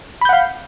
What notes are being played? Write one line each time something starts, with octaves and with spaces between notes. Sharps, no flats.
F5 F#5 B5 G6